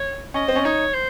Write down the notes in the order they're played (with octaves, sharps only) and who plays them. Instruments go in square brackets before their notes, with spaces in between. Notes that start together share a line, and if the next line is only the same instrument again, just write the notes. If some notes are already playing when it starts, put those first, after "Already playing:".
Already playing: [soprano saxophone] C#5
[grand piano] C#4 [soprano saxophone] D#5
[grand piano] C4
C#4
[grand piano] D#4 [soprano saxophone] C#5
[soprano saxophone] C5